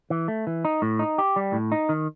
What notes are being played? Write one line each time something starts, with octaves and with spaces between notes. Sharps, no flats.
E3
A3
E3
D#4
A2
D#4
G4
G3
A2
D#4
D#3